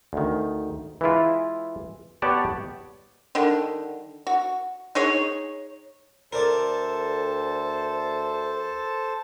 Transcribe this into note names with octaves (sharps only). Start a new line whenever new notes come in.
D2 D#3
E3 G#3 E4 F4
B3 G4 C#5 D5 F#5 A5
D3 D#3 G3
F#4
D#4 G#4 C#5
D2 A4 A#4 C5 D5 A5